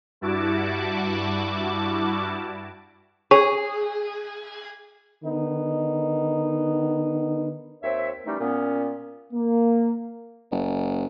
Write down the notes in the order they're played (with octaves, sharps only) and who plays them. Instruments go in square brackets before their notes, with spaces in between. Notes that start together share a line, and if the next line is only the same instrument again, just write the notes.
[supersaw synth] G2 G3 E4 F#4 A5 D6
[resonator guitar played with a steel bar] G#4 [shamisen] C#5
[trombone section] D3 D#3 B3 D#4
[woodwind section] D#2 C4 C#5 E5
E3 G3 A3 C#4 D#4
A#2 B3 C#4
[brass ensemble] A#3
[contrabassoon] F#1